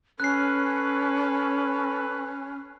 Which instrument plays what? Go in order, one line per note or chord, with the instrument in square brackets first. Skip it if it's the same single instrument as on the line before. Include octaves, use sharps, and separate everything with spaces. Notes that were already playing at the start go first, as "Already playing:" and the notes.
[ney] C#4 [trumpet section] A4 B4 [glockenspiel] F#6 C7